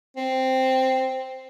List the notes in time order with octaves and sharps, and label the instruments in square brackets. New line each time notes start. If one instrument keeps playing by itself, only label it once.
[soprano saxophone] C4